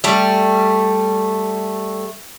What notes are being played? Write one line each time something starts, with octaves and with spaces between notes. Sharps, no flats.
G3 A3